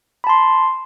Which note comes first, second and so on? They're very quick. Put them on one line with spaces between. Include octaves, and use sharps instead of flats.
B5 A5 C6